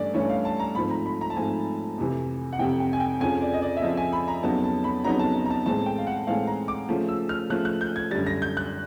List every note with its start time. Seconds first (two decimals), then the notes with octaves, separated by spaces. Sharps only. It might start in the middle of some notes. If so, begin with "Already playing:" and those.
Already playing: G2 E3 A3 C#4 D5
0.14 G2 E3 A3 C#4 C#5
0.29 F5
0.45 A5
0.60 A#5
0.75 G#2 F3 A3 C4 B5
0.90 A#5
1.06 B5
1.21 A#5
1.30 A5
1.36 G#2 F3 A3 C4 G#5
1.98 F2 C3 E3
2.53 F#5
2.59 F2 C3 E3 G5
2.80 G5
2.93 G#5
3.00 G5
3.21 F2 C#3 F3 G#5
3.41 D5
3.54 D#5
3.62 D5
3.77 E5
3.82 F2 C#3 F3 D#5
3.97 G#5
4.13 B5
4.28 A#5
4.43 F2 C#3 F#3 B3 D#4 A5
4.64 A5
4.84 B5
5.04 F2 C#3 F#3 B3 D#4 A#5
5.19 A5
5.35 A5
5.46 A#5
5.50 A5
5.66 A2 E3 G#3 C4 A5
5.86 G5
5.98 F5
6.07 F#5
6.27 A2 E3 G#3 C4 F5
6.47 A#5
6.68 D6
6.88 C#3 F3 A3
7.08 E6
7.29 F6
7.49 C#3 F3 A3 F#6
7.65 F#6
7.81 G6
7.96 G#6
8.11 F#2 D3 G3 A6
8.26 A#6
8.42 G6
8.57 F#6